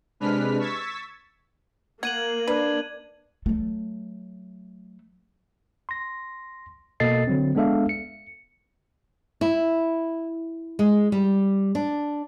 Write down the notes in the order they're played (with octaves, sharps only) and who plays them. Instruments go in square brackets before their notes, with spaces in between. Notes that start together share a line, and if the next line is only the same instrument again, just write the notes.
[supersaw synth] C3 G#3 D4 B4 F6 B6
C#6 E6 G#6 A6 B6
[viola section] A#3 [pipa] F#5 [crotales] G#6 D#7 F#7
[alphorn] D4 [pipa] B4
[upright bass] F#3 A3
[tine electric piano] C6 A#6
B2 A#3 A4 D#5 A6 C7
D3 F#3 C4
G#3 B3 D4 A4 E5 F5
C#7
[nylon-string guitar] E4
G#3
G3
D4